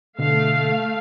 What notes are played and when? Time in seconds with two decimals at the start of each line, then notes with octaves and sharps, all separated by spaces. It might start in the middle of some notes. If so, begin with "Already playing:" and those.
0.19 B2 D3 A3 F5